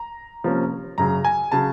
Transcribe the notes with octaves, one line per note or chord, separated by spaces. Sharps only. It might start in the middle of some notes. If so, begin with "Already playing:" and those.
Already playing: A#5
C3 F3 A#3 C#4
F#2 C#3 F#3 A#5
G#5
C#3 F#3 A5